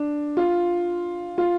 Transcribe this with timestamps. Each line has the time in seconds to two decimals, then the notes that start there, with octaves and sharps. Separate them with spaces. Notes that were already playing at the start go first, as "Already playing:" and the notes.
Already playing: D4
0.37 F4
1.38 F4